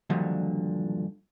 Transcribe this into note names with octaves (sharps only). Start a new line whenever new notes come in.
G2 A#2 D3 D#3 F3 F#3